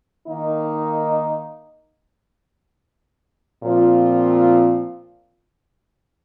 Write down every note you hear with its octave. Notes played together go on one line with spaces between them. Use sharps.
D#3 A#3 D#4
A#2 F3 C4 F4